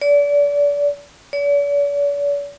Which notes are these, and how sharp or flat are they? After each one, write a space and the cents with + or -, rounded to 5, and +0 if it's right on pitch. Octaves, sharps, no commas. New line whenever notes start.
D5 -30
D5 -45